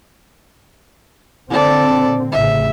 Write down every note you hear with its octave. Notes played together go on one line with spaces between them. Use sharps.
A#2 D3 C4 A4 D5
A1 C#3 E5